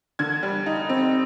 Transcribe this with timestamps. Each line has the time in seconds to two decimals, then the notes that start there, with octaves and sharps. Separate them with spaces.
0.19 D3 G#6
0.43 G3
0.66 D#4
0.89 C4